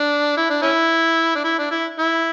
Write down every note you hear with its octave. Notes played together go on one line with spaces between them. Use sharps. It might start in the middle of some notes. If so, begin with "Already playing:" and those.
Already playing: D4
E4
D4
C#4 E4
D4
E4
D4
E4
E4